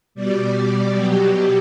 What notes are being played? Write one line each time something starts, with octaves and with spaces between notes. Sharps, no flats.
B2 G3 D5
B2 F#3 G4